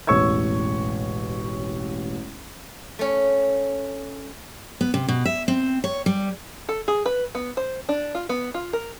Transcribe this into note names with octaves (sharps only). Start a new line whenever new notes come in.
E1 A1 C#5 C#6 E6 G#6
A3 C#4
B3
C3
B2
E5
C4
C#5
G3
A4
G#4
B4
B3
C5
D4
F4
B3
F4
A#4